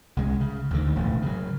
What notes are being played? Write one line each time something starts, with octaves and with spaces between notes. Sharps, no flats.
C2 G#3
C#3
D2 D3 D#3
E1 A2
C#3 F#3